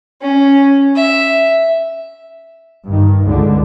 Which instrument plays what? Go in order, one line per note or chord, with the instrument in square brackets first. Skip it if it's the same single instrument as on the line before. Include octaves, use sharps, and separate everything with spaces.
[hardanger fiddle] C#4
E5
[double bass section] G2 D#3
C#2 D3